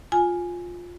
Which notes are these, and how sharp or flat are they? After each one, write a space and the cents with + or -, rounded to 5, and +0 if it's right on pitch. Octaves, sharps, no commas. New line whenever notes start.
F4 +10 G#5 +0